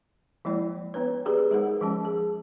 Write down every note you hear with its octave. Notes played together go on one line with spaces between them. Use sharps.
F3 G#3 A#3 E4 D5 G5
B3 D4 B4 C#5
B3 D4 G4 G#4 B4 D5
G#3 D#4 G#4 A#4 C5 F#5
F3 G#3 C#4
G#4